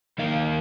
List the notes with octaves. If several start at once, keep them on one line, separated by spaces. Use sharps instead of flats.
D#3 A#3 D#4 A#4 F5